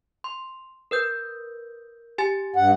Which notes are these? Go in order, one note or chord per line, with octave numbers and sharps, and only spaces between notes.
C6
A#4 B4 G6
G4 G#5 A6
G2 F#5